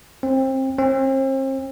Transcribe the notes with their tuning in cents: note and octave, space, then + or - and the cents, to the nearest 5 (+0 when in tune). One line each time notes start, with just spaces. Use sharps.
C4 +25
C4 +40